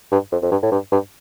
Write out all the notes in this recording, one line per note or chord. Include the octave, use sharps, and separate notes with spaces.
G2
F2
F2
G2
A2
G2
G2